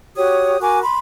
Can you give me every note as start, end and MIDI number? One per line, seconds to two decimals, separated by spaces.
0.16 0.57 66
0.16 0.57 67
0.16 0.57 73
0.16 0.57 87
0.60 0.81 66
0.60 0.81 70
0.60 0.81 80
0.60 0.81 86
0.83 0.98 83
0.83 0.98 84